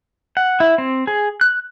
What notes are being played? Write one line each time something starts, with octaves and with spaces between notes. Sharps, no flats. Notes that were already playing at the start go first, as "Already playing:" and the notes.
F#5
E4
C4
G#4
F#6